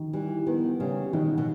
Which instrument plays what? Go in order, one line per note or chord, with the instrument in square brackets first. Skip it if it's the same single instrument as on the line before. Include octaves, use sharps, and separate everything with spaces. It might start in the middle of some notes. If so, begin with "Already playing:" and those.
Already playing: [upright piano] D#3
[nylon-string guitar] E3 [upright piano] G3
[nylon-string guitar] D#3 [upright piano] B3
[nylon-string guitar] C#3 [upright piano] G3
[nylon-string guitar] B2 [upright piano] D#3
[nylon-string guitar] B2